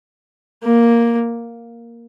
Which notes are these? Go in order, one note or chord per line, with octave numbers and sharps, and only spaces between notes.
A#3